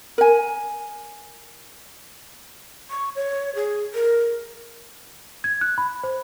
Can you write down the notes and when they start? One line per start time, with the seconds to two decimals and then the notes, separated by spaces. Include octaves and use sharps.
0.18 A#4 G#5
2.90 C#6
3.15 C#5
3.55 G#4
3.94 A#4
5.44 G#6
5.61 F#6
5.78 B5
6.03 C5